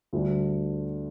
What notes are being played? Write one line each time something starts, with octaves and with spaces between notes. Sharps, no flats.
D2 D3 G3 D4